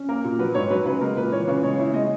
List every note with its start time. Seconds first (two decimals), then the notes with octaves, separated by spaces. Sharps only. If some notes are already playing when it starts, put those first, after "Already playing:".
Already playing: C#4
0.09 A#3 A#4
0.25 A#2
0.39 F#3 B4
0.55 G#2 C#5
0.70 F#3 B4
0.85 C#3 B4
1.01 G#3 A#4
1.17 A#2 B4
1.32 E3 C#5
1.48 C#3 B4
1.63 G#3 C#5
1.79 E4
1.94 G#3 D#5